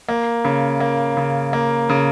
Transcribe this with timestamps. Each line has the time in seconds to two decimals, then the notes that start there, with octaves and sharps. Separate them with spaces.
0.09 A#3
0.45 C#3
0.80 A#3
1.17 C#3
1.53 A#3
1.89 C#3